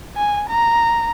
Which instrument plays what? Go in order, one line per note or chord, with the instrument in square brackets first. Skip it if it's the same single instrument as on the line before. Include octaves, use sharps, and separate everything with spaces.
[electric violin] G#5
A#5